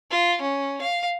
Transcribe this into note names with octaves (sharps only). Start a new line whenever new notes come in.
F4
C#4
F5